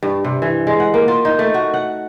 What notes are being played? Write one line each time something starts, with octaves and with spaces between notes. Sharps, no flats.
G2
C3
E3
G#3
F#5
A#3
F4
D#4
A3
F#4
F#5